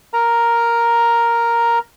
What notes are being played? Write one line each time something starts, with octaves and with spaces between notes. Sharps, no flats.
A#4 A#5